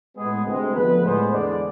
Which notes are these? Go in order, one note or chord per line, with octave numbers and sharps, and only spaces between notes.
A2 G#3 B3 G#4
D2 C3 G#3
D2 D3 F3 B3 B4
A2 G#3 B3 C5
E2 D3 G#3 B3 D5